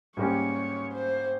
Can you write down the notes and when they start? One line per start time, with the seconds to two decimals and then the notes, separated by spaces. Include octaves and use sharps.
0.17 G#2 G3 A#3 C#4 G4 C#5
0.93 C5